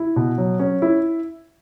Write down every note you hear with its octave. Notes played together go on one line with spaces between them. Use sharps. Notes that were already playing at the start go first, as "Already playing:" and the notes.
Already playing: E4
B2
F#3
C#4
E4